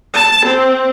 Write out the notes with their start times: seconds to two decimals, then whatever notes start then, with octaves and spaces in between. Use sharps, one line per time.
0.14 A5
0.46 C4